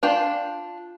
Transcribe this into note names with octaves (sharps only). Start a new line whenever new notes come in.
D4 F4 G5